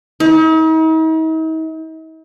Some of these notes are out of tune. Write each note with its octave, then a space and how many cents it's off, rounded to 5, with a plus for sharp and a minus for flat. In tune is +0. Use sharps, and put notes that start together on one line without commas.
D#4 +45